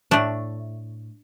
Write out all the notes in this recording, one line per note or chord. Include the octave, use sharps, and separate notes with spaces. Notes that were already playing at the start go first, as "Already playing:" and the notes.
A2 A3 D4